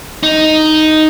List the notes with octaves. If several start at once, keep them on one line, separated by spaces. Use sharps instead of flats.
D#4